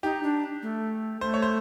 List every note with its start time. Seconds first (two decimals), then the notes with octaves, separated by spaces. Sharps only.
0.03 D#4 G4
0.23 D4
0.62 A3
1.21 A3 C5
1.34 C#5
1.42 C5